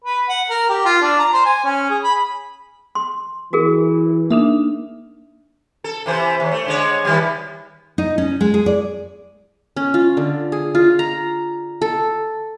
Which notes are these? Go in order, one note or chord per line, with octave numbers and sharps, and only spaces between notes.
B4
F#5
A#4
G4
F4
D4
A#5
C5
G#5
C#4
G#4
B5
C6
E3 F#4 G#4 A#4
A#3 D4 D#4 E5
A4
C3 E3 C5
D#2
A3
D3 G#3 C#5
D#3 G3
D#4
C#4
G#3
G#4
D5
C#4
F4
D3
G#4
F4
A#5
A4